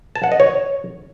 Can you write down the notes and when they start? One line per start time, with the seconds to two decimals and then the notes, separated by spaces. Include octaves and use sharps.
0.15 A5
0.24 F#5
0.32 D#5
0.40 C#5